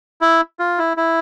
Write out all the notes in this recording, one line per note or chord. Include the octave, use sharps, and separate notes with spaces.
E4
F4
E4
E4